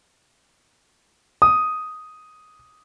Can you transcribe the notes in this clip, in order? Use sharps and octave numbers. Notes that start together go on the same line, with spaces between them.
D#6